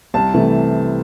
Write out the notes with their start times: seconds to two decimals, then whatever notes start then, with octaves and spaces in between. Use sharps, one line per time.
0.14 C2 A5
0.34 C3 E3 A3